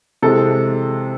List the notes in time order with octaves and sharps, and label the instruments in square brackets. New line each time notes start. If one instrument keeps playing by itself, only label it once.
[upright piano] C3 E3 G#3 A4